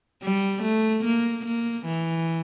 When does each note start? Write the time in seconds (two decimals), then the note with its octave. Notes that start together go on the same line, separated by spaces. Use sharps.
0.23 G3
0.63 A3
1.04 A#3
1.45 A#3
1.86 E3